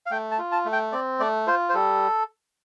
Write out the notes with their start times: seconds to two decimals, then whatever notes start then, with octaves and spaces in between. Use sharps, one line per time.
0.06 F5
0.11 A3 G5
0.31 A5
0.38 F4
0.52 A5
0.65 A3
0.73 G5
0.92 C4 D5
1.20 A3 D5
1.47 F4 C5
1.69 C5
1.74 G3 A4